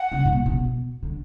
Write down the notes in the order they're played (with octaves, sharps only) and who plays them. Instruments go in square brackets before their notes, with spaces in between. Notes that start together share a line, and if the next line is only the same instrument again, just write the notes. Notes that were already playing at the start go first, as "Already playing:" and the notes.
Already playing: [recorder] F#5
[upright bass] C#3
A2
B2
C#3
B2
D3